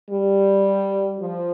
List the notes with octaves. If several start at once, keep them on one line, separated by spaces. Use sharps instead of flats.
G3
F3